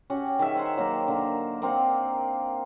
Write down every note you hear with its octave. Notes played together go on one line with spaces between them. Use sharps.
C#4 F#4 G4 F#5
D#3 G#4 E5
C5 F#5 C6
F#3 A#3 G4 A#4
D3 A#3
A#3 C4 F5 F#5